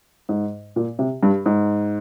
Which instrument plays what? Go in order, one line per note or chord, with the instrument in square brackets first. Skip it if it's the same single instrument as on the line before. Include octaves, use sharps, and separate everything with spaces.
[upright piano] G#2
A#2
C3
G2
G#2